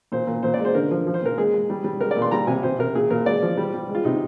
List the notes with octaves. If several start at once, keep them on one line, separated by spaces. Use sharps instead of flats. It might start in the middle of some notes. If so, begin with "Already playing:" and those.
A#2 C5
A#2
A#2 C5
D5
G#3
C5
D3 A#4
F3
F3
C5
A#2 A#4
G#3 G#4
G#3
G3
G3
G#3 A#4
D5
A#2
C6
G3 A#5
C3 G#5
C3 C5
C3 A#4
A#2 G#4
A#2 A#4
G#3 D5
F3
G3
G3
G#3
F4
C3 D#4